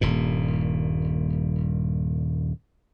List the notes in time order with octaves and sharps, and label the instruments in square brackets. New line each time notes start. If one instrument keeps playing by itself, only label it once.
[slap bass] D#1 G2 A#2